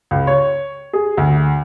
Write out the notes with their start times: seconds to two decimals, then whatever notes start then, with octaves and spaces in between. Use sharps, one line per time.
0.11 C#2
0.27 C#5
0.93 G#4
1.17 D2